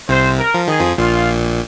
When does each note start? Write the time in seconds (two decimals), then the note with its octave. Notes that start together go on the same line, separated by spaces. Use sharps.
0.09 C2 C3 C5
0.39 A#4
0.54 F3
0.68 D#3 G#4
0.80 F2 F3
0.98 A#1 A#2 F4